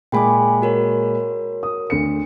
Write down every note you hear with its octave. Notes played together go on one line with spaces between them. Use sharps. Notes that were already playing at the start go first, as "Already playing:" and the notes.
A#2 G#3 G5 G#5 B5 D6
F#4 A#4 C#5
D#6
D2 C#7